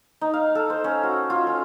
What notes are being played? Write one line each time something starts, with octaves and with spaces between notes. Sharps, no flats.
D#4
F5
A4
C5
C#4
F#4
F4
C#4